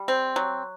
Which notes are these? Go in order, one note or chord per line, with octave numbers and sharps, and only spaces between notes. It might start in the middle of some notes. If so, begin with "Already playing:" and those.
Already playing: G3
C4
F#3